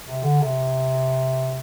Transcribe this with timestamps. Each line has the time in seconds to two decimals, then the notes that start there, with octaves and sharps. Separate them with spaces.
0.05 C3
0.23 D3
0.41 C3